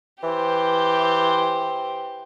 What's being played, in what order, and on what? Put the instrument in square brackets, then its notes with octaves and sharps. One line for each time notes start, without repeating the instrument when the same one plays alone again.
[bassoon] E3 [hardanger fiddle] G4 C5